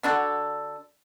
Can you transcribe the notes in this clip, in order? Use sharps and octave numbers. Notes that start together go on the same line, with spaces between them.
D3 D4 F#4 A4